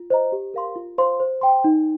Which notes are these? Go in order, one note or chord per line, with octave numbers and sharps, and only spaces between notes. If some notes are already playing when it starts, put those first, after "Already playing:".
Already playing: F4
C5 D#5 A#5
G4
A#4 F5 C6
F4
C5 F5 C6
C5
G5 C6
D#4